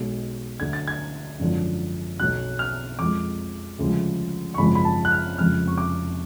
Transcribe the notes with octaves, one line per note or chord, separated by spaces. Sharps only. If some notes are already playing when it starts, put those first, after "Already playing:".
Already playing: B1 B2 G#3
D2 D3 F#3 G#6
A6
G#6
G#1 F#2 D3 F3
B1 B2 F#3 F#6
F6
F2 F3 G#3 D6
D2 C#3 F3 G#3
C#6
G#1 F#2 C#3 F3 G#3 B5
B5
A5
F#6
F6
F1 F2 C#3 F3 G#3 F6
C#6
D6